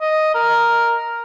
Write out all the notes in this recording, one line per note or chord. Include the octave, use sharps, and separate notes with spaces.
D#5
A#4